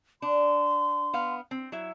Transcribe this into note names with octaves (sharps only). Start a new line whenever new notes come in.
D4 C6
B3 F5
C4
F#3 E4 E5